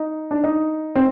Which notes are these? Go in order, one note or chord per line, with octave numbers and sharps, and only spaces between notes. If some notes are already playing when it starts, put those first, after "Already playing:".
Already playing: D#4
D4
D#4
C4